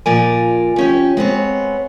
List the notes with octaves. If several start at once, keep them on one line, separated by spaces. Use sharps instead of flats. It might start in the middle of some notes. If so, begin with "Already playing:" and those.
A#2 F3 A#4 D5 G#5
F3 C#4 G4
G#3 B3 C4 C#5